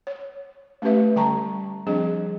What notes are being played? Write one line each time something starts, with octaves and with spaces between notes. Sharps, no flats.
C#5
A3 C#4 G4 B4 E5
D3 G3 G5 A5 A#5 C#6
F3 G3 C4 D4 G#4 D#5